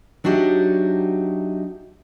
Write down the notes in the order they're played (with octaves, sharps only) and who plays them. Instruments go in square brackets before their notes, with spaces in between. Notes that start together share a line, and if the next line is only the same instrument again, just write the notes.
[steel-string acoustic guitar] F#3 D4 D#4 F#4 G4 E5